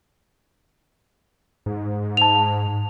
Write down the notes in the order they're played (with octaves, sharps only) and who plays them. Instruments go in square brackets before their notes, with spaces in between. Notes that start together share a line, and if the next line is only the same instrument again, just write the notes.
[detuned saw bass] G#2
[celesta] A5 F7